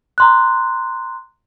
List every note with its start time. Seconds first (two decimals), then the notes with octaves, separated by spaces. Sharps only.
0.18 A#5 C6 F#6